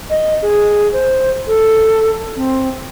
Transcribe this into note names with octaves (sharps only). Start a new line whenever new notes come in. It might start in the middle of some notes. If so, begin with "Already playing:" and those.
D#5
G#4
C5
A4
C4